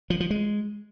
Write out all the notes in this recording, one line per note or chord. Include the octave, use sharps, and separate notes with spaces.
F3
F3
G#3